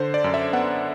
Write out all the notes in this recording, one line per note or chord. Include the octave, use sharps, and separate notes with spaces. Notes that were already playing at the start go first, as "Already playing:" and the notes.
Already playing: D3 C5
D5
F#2
E5
B3 F#5